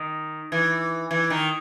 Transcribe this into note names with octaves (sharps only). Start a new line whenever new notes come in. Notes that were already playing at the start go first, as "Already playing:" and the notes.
Already playing: D#3
E3
E3
D#3